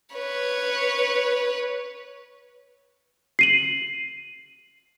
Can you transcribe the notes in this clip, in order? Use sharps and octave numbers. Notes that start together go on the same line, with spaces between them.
B4 C#5
C7 D#7 F#7